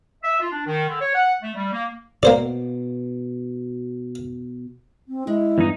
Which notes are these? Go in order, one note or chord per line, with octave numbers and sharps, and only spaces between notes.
E5
F4
D4
D#3
D3
C#5
F#5
A3
G3
A#3
B2 A#3 C5 D5
C4
G#3 E4
E2 G2 D#4